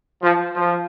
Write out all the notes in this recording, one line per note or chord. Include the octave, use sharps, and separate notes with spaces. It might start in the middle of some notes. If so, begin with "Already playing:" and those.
F3
F3